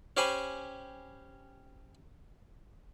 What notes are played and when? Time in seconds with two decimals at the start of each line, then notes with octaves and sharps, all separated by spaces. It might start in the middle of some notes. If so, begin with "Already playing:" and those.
0.17 C#4 G4 C5 G#5 B5